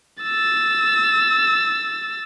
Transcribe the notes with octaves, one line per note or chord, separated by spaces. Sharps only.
E6 A6